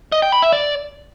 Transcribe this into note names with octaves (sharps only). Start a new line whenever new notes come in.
D#5
G5
B5
E5
D5